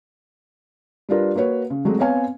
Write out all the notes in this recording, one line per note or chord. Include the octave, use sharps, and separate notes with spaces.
G3 D4 F4 A#4 B4
A#3 F#4 B4 C#5
C#3
F#3 G#3 A3 C4
B3 C4 B4 C#5 F5 G#5